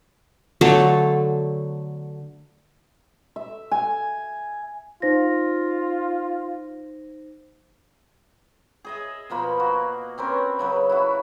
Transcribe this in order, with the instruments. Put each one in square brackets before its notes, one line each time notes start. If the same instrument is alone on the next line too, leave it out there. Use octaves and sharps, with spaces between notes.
[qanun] D3 F#3 A3 A4
[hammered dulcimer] E5
G#5
[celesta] D#4 C5 A#6 [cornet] F4
[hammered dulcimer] G#4 D#5 E5
B2 F3 A#3 B5
F#4
C4 C#4 A#4 B4
C#3 F#3 B4
E4 F#4